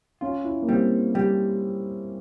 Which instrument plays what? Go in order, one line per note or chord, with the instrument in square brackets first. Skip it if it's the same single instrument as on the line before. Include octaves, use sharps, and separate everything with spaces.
[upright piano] C#4 [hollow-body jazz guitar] F4
[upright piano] E4
A#3
[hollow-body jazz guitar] G3 [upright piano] C4
[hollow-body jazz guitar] G3 [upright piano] G4